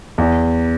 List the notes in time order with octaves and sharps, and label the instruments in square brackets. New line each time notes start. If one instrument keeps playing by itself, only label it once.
[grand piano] E2